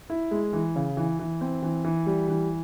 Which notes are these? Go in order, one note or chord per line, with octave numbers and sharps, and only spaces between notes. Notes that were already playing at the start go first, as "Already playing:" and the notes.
E4
G#3
E3
C#3
E3
E3
C4
E3
E3
G3
E3